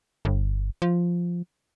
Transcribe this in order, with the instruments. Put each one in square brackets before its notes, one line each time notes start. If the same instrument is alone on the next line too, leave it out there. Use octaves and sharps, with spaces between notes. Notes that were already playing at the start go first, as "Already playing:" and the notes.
[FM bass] G1
F3